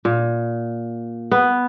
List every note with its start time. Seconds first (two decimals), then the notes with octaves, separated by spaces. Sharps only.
0.05 A#2
1.31 B3